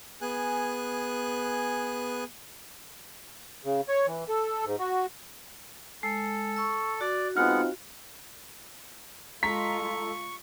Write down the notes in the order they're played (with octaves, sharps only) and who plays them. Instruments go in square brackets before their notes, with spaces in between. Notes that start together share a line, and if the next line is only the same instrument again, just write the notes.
[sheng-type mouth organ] B3 G#4 G#5 F#6
[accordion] C#3
C#5
E3
A4
G#2
F#4
[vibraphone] G#3 [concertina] A4
[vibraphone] C#6 E6
[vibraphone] F#4 [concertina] D5
[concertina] G#3 B3 F#5 [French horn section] C4 D#4 F4 [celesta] F6
[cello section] G#3 F4 [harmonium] A4 [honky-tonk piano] A#5 B6 [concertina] C#6